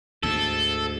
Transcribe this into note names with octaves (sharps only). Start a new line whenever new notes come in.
D2 G#2 A4